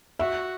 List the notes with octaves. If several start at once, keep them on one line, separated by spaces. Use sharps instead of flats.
F#4 E5